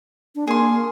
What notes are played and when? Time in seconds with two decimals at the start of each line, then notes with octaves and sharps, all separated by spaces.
0.35 D4
0.47 A#3 G#4 C6